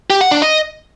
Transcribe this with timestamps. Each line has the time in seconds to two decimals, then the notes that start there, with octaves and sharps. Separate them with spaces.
0.10 G4
0.21 F#5
0.31 D4
0.42 D#5